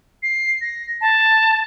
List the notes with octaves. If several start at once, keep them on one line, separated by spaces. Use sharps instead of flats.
C7
A#6
A5